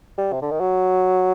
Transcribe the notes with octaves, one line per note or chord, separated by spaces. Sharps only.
G3
C3
D3
D#3
F#3